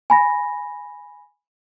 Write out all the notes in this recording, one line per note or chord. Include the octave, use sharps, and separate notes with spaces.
G#5 B5 A#6